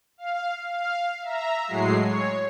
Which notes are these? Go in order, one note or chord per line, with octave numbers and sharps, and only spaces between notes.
F5
F5
E5 A#5
A2 F#3 G#3 C7
C#5